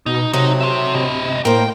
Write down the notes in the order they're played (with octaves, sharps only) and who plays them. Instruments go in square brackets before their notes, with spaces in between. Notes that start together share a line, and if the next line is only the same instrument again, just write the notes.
[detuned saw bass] B2 [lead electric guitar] D#4
[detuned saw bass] C3 [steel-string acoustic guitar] F#3 A3 C4 [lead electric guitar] D#4
[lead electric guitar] C5 E5
[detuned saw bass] C3 [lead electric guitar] E4 D#5
[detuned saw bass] A2 [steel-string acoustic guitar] A#3 C5 [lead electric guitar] G5